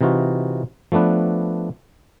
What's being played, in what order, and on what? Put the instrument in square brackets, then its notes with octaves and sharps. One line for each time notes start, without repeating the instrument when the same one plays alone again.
[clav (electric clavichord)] C3 E3 D#4 F4 F#4
F3 A3 B3 D4 B4